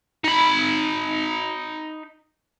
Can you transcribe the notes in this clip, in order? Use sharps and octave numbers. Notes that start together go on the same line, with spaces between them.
D#4 B5